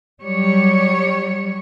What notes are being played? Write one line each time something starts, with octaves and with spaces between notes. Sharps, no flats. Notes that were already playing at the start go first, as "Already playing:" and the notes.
F#3 G3 C#5